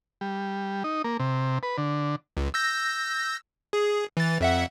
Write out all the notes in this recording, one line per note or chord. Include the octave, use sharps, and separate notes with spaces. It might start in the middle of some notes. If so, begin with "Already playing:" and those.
G3
D#4
A#3
C3
B4
D3
C#2
E6 G6 A#6
G#4
E3 A6
F2 E5 F#5